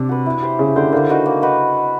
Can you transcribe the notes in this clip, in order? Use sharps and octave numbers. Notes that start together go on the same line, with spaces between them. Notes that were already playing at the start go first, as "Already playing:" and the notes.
Already playing: C3 D4
F#4 B4
E4
G4 C5
C#3 E4
D3 G4 C5
D3 A#3
D#4 F#4 B4
A#3
D#4 F#4 B4